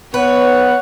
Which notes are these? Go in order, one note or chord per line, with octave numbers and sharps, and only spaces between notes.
B3 B4 C#5 F#5